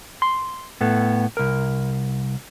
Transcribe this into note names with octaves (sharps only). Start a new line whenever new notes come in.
C6
A2 B3 A4
C2 A#4